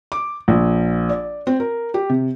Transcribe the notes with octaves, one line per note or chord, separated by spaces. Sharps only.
D6
A#1
D5
C4
A#4
G4
C3